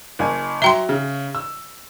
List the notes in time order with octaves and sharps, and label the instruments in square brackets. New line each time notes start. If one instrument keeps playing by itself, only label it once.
[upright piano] F#1 G#5
[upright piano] F#3 A#5 G7 [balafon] E5 G5 C6
[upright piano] C#3
E6